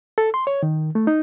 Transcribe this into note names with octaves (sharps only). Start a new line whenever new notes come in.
A4
C6
C#5
D#3
A3
D#4